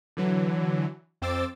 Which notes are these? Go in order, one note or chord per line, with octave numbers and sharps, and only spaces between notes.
D3 E3 F#3
F2 C4 C5 D6 E6 A6